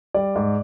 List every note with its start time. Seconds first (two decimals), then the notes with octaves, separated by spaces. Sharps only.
0.14 G3 D5
0.36 G#2